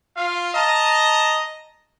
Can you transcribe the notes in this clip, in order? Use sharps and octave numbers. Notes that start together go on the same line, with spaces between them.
F4 F5
D#5 A5 A#5